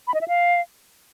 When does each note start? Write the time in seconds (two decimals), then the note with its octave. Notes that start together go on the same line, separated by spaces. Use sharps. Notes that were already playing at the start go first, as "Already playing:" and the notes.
0.07 B5
0.14 D#5
0.21 E5
0.28 F5